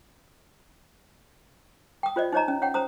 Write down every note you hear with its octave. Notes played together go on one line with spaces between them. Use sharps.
G5 D#6
F4 C5 D5 D#5
D#4 C5 C#5 D#5 A#5
C#4
C#5 F#5 G5
C5 A#5 D#6